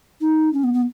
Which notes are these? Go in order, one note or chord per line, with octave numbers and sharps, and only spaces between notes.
D#4
C#4
B3
B3